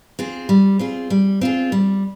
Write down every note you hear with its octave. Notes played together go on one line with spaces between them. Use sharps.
C4 F4 G#4
G3
C4 F4 G#4
G3
C4 F4 G#4
G3